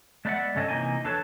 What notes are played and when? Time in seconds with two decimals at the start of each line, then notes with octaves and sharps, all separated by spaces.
0.25 G#3 A3 B3 D5 E5 F#5
0.55 G2 C#3 C#4 A4 D#5
0.68 C3 E3 A#3 D#4 D#5 G#5
1.04 E2 D4 A4 B4 C#5 A5